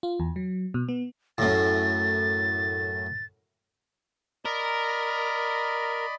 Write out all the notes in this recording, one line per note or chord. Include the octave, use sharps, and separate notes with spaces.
F4
E2
F#3
B2
B3
F#2 A2 A6
A#4 D5 D#5 B5